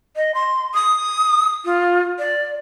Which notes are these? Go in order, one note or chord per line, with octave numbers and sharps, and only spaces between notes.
D#5
C6
D#6
F4
D5